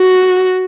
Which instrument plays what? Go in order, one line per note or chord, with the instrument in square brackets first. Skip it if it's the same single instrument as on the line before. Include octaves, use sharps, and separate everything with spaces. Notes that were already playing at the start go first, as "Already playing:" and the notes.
Already playing: [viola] F#4